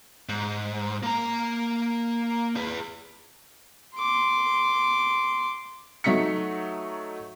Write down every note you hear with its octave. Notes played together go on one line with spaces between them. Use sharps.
G#2
A#3 A#5
G#4 B4
C6 D6
F#3 A3 D#4 B6 C#7